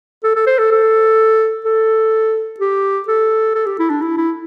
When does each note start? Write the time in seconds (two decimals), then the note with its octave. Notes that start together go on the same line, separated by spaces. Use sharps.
0.24 A4
0.36 A4
0.47 C5
0.59 A4
0.72 A4
1.65 A4
2.60 G4
3.08 A4
3.55 A4
3.66 G4
3.79 E4
3.90 D4
4.02 E4
4.17 E4